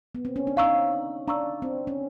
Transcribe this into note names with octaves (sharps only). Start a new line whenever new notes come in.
B3
C4
C#4
D4
D#4 F5 A#5 C#6 E6
D4 F5 A#5 C#6 E6
C4
C#4